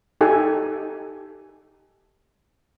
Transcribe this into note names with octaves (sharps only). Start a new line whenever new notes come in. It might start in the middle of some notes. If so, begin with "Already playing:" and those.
D#4 G4 A4 G#5